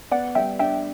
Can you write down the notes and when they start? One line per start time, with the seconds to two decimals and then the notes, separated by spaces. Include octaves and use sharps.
0.11 B3 D5 F#5
0.35 G3 E5 G5
0.59 D4 E5 G5